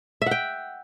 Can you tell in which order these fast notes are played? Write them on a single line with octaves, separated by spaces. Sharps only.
E5 F#5 G5